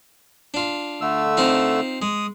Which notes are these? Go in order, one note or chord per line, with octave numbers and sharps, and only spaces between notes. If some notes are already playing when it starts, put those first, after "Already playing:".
D4 F4
D3 A3 E6
C4 D#4 F4
G#3 D#6